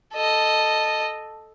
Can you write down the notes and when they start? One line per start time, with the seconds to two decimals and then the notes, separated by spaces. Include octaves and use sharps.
0.14 A4 D#5